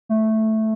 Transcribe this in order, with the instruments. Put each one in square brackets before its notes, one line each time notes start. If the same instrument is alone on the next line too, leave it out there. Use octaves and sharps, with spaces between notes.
[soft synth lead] A3